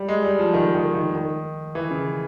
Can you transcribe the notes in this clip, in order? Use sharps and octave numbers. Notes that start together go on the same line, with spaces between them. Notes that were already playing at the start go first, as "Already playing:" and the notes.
Already playing: G3
G#3
G3
F3
D#3
D#3
D#3
D#3
E3
C#3